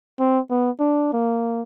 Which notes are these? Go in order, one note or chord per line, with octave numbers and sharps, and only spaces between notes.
C4
B3
D4
A#3